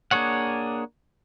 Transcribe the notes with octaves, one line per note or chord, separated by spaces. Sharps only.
A#3 D4 G#4 C#5 F#5